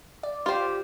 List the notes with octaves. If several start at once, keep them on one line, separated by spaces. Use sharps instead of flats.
D5
F4 G4 C5